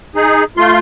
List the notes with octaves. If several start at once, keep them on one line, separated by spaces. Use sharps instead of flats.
D#4 G#4
A3 F4 C6